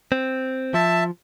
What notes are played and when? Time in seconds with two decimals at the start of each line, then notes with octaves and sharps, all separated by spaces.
0.12 C4
0.74 F3 E5 A5